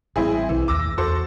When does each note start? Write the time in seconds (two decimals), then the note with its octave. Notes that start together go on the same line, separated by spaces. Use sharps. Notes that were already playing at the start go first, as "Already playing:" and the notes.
0.16 A1 G3 A3 C4 E4 G#4
0.49 B1 E3
0.68 A1 D#2 A3 D6 E6 A#6
0.98 E2 F#4 A4 C5